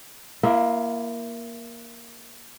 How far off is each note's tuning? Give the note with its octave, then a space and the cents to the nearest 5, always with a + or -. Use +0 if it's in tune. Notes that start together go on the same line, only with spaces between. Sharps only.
A#3 +10 E4 +35 E5 -35